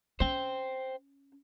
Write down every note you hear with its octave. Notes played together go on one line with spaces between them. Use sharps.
C#4 C5 G5